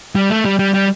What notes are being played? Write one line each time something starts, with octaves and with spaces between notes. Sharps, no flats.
G3
A3
G3
G3
G3